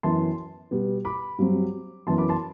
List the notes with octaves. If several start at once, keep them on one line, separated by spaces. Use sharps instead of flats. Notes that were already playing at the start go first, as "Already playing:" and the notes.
F#2 E3 B3 A5 C6
B2 G3 B3
B5 D6
G2 F#3 C4
F#2 E3 B3 A5 C6
B5 D6
A5 C6